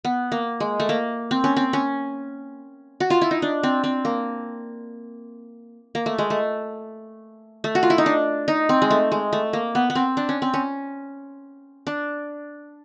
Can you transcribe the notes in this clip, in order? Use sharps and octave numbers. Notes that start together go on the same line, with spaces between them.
B3
A#3
G#3
A3
A#3
C4
C#4
C4
C#4
F#4
F4
E4
D#4
D4
C4
C4
A#3
A#3
A3
G#3
A3
A3
F#4
F4
E4
D#4
D4
D#4
C4
G#3
A3
G#3
A3
A#3
B3
B3
C4
D4
C#4
C4
C#4
D4